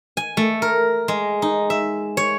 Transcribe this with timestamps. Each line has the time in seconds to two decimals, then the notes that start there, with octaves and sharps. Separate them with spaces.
0.17 G#5
0.37 A3
0.62 A#4
1.08 G#3
1.42 D#4
1.70 E5
2.17 C#5